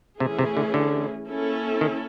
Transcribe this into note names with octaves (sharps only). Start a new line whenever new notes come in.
C3 E3 A3 C#4 E4 G#4
C3
D3
D3
A#3 C#4 E4 A4
D#3